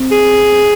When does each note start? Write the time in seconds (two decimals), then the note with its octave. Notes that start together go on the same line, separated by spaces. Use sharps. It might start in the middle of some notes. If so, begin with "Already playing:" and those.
Already playing: C4
0.12 G#4